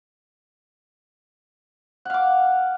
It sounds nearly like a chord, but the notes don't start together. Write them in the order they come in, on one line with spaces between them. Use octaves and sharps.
F#5 F5 D6